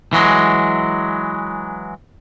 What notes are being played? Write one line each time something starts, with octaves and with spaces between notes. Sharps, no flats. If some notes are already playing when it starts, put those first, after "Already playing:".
E3 F#3 G#3